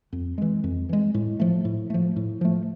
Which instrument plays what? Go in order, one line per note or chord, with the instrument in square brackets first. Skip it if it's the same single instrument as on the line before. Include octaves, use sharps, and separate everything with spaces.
[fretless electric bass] F2
E3 G#3
F2
E3 G#3
A2
F3 A3
A2
F3 A3
A2
F3 A3